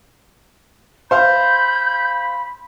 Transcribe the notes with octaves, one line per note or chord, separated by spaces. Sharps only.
C5 F5 B5 C6 G6